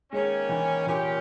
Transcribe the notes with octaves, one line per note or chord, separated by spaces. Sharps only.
D#3 G#3 A#3 C#4
E3
A#2 E3 A#3 C#4 G4